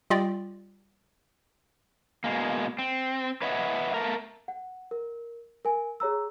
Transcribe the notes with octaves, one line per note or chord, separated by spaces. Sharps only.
G3 F4 D5 D#5 G5
B2 G#3 A#3
C4
B4 C#5 D#5 E5 F#5
A3 A#4
F#5
A#4
A#4 G#5
G#4 C#5 A#5 E6